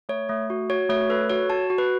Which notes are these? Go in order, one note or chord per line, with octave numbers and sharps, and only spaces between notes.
A3 C#5
A3
F#4
F#4 C#5
A3 C#5
A4 B4
F#4 C#5
F#4 A5
F#4
B4